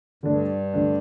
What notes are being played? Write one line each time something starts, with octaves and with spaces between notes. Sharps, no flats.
G2 D3 A3 D4
D3 A3 D4